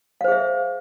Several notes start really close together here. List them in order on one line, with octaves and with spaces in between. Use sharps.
F5 C5 G#4 E5